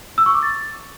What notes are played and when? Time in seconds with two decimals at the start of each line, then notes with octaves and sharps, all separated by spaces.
0.18 E6
0.26 C#6
0.34 D6
0.43 A6